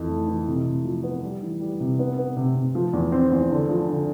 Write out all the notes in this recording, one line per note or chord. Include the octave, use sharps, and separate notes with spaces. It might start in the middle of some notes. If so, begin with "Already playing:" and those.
Already playing: F2 E3
A3
E3
C3
C3
F3
B3
G3
E3
G3
C3
B3
B3
C3
C3
F3
E2
C4
E2
D3
F3
D3